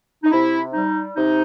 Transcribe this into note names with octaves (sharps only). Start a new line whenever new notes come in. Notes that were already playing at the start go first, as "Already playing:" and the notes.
D#4
C3 E4
G3 D#4
C3 D#4